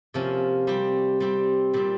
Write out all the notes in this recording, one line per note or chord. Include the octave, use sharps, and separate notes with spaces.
C3 F3 A#3 C#4
G3 C4 G4
G3 C4 G4
A#2 G3 C4